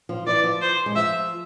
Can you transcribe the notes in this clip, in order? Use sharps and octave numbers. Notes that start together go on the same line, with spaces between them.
F3
E3 D5
F3
C5
G#3
F3 E5